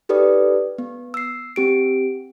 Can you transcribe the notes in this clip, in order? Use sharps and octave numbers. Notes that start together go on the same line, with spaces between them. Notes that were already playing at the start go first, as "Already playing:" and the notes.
D#4 G4 A4 B4 D5 D#6
B3
E6 C7
C4 G4 D7